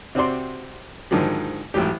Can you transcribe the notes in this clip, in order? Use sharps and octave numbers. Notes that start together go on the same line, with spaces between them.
C3 C4 F#4 D5 C6
G#2 D3 D#3 F3 F#3
A1 G#2 F#3 G4